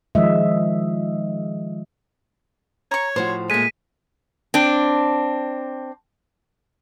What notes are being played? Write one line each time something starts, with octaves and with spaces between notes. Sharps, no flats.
D#3 F3 G#3 D#5 E5
C#5 A#5 C#6
A2 F3 F#4 C5
A#2 G#3 A3 B6 D#7
C4 D4